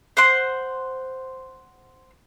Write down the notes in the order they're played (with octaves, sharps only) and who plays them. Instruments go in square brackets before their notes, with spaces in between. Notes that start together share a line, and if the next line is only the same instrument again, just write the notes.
[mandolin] C5 F#5 C6